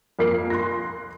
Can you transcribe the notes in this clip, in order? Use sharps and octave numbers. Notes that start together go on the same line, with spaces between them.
F2 A#3 A#4 C7
C6 F#6 A#6